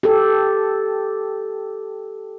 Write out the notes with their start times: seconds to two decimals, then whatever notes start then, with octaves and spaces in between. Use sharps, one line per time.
0.03 G4 A4